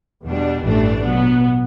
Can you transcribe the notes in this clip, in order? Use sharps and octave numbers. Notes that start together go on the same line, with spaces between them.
E2 B2 G3 D4
A1 G2 E3 A3 D4
B2 F#3 B3